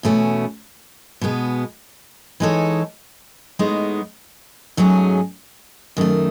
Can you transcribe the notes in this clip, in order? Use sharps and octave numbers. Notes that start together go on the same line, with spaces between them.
E2 B2 A3 C#4
B2 G#3 B3
E3 G#3 D#4 A4 C#5
A2 G#3 B3 D#4
G#2 F#3 A3 C#4 G#4
F#2 D#3 A3